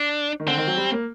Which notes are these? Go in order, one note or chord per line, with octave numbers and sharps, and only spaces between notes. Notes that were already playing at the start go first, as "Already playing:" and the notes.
Already playing: D4
D#3
D3 C4
D#3
F#3
G3
A#3